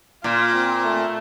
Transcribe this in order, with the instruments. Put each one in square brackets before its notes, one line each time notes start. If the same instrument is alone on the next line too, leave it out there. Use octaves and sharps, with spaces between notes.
[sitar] A#2 [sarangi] F4
[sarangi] C4
A3